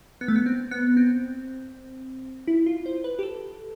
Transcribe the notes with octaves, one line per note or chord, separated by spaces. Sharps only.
B3
A3
B3
C4
B3
C4
E4
F4
C5
B4
G4
A4